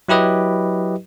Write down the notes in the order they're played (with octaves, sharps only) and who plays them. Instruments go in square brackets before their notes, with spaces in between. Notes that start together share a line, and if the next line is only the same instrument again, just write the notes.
[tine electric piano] F#3 E4 G4 B4 D#5